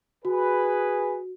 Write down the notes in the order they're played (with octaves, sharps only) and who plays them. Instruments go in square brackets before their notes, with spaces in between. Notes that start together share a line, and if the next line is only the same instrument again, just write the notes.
[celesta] F#4 [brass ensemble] G#4 B4